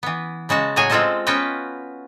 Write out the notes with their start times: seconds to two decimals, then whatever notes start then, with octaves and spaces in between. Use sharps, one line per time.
0.03 E3 B3
0.49 C#3 G#3 F#4 A5
0.76 A2 F#3 F#4 G#4 C#5 G#5
0.90 G#3 C4 F4 A4 C5 D#5
1.27 B3 C#4 F4 F#4 B4 G5